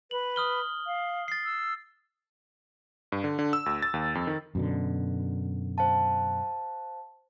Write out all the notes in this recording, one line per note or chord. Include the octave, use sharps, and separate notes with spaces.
B4 F#7
D#6 F6 G7
F5
A6 C7
E6
G2
D3
D3
E6
D2
A6
D#2
F2
D#3
F#2 B2 D3
C5 F5 A5